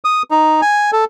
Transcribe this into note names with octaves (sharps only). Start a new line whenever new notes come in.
D#6
D#4
G#5
A4